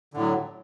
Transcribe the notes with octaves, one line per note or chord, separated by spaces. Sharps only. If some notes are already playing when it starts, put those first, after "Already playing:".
A2 D3 F#3